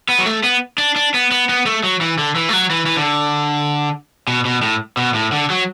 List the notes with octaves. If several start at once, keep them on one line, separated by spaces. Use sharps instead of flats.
B3
F#3
A3
B3
D4
D4
B3
B3
B3
A3
F#3
E3
D3
E3
A3
F#3
E3
E3
D3
B2
B2
A2
B2
A2
D3
F#3